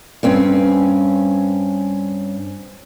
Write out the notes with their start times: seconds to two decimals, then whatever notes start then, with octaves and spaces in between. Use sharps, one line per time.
0.23 G2 C4 C#4